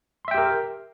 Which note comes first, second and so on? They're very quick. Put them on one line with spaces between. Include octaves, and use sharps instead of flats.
C6 E5 G5 G4 A#4